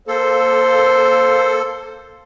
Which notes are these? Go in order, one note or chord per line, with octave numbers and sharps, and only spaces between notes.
A#3 A4 C5